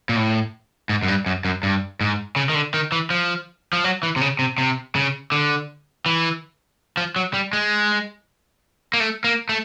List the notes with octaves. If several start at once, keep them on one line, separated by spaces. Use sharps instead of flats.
A#2
A2
G#2
F#2
G2
F#2
F#2
G2
G#2
C#3
D#3
D3
D#3
E3
F3
F3
F#3
E3
C3
C#3
C3
C3
C#3
D3
E3
F3
F#3
G3
G#3
A#3
A3
A#3
A3